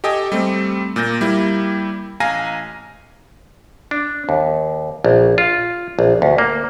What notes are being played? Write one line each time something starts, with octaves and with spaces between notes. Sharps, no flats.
G4 A4 D#5 G5 G#5
G3 A3 C4
A#2 A#3 G6 A#6
G3 A#3 E4
A1 F5 G#5 A#5 A#6 D#7
D4
D#2
A#1
F4
A#1
D2
A#3